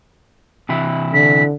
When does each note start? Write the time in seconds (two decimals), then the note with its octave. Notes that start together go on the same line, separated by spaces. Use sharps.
0.69 C3 E3 E4
1.14 D3 B6